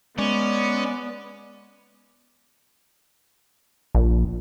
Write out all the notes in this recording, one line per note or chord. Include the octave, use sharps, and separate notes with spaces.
G#3 B3 C#4 D5
A#1